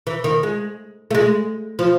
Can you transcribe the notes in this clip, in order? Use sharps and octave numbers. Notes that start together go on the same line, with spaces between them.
E3
D#3
G#3
A3
G#3
F3